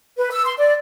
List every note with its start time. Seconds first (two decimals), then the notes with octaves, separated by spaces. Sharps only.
0.18 B4
0.32 E6
0.45 C6
0.58 D5